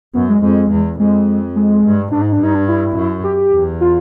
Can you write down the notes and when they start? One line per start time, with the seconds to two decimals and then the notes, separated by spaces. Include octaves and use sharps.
0.14 F#2 B3
0.29 G#3
0.42 F2 G#3
0.71 E2
0.99 F2 G#3
1.56 G#3
1.84 G2
2.11 G#2 D4
2.22 D#4
2.32 D4
2.40 G2 D#4
2.55 D4
2.69 E4
2.96 F#2
3.24 G4
3.53 E2
3.81 F4